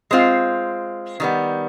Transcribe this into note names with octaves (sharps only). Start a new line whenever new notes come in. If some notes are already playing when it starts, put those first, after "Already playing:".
G#3 C4 F4
D#3 G3 B3